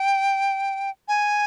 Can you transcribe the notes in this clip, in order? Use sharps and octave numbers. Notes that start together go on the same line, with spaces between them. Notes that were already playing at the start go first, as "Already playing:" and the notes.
Already playing: G5
G#5